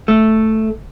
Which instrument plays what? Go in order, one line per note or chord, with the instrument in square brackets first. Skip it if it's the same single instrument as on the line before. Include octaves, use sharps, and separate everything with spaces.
[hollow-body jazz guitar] A3